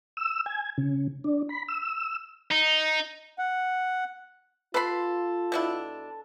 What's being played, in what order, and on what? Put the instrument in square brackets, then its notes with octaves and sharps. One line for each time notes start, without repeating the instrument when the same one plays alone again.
[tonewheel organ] E6
G#5
C#3
D4
B5
E6
[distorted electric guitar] D#4
[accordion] F#5
[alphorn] F4 [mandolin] A4 C6 [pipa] B4 B5
[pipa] B2 D4 E4